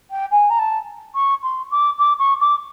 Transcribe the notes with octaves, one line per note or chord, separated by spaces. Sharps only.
G5
G#5
A#5
A5
C#6
C6
D6
D6
C#6
D6